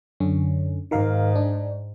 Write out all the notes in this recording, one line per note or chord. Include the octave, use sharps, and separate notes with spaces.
F#2 D3 C#4
G#2 D#3 A#4 F5
D4